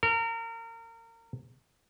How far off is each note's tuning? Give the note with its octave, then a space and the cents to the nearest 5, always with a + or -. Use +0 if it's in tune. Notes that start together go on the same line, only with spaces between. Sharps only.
A#4 -30